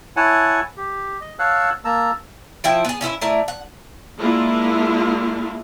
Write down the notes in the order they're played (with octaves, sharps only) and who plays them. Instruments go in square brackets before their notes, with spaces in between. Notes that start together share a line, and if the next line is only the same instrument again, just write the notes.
[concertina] E4 C#5 F#5 G#5 A5
G4
D#5
C#5 F5 F#5 A5 E6 F#6
A#3 A5 A#5 E6
[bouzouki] F3 E4 G5
B3 G#4
C#4 E4 A4 E5
A3 E4 A#4 D5
F#5
[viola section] G#3 A#3 D4 E4 F4